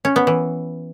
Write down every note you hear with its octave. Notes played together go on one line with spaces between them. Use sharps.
C#4
B3
E3